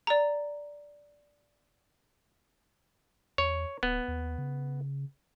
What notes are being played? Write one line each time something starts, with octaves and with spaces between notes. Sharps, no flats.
D5 A#5
E2 C#5
D1 B3
D#2
C#3